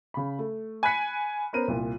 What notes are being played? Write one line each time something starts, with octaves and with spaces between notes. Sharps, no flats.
C#3 B5
A3
G#5 B5 F#6 B6 C#7
B3 C#4 A#4 C5 D#7
C2 A#2